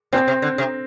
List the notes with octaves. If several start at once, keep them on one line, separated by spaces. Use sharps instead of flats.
A#2 C4
C3
D3
C3